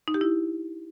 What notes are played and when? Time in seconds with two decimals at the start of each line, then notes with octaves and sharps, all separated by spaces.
0.08 D#4
0.14 G4
0.21 E4